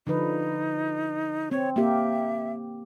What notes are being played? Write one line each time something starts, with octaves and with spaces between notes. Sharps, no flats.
D3 F3 D#4 B4
C4 C#5
A#3 G4 E5